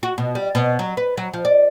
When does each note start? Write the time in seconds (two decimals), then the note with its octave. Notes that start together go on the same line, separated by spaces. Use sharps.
0.03 F#4
0.18 B2
0.35 G3
0.55 B2
0.79 F#3
0.97 B4
1.17 F#3
1.33 F3
1.45 D5